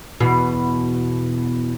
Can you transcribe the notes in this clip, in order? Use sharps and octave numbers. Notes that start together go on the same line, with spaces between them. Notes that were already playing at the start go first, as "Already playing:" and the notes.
E2 B2